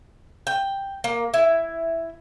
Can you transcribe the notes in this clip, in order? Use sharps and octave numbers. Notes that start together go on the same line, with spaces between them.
G5
A#3
E4